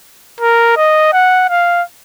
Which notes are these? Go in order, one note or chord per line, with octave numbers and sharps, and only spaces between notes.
A#4
D#5
F#5
F5